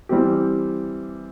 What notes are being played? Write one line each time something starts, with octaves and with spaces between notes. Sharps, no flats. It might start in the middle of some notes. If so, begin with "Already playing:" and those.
E3 G3 C4 G4